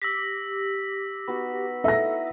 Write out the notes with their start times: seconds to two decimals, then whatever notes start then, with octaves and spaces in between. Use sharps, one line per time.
0.02 G4 E6 A#6 B6
1.27 B3 D#4 F#4
1.84 D#4 E4 A4 D#5 E5 A#6